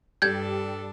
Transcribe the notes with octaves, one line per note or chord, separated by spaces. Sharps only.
G2 G3 D4 A4 G6 G#6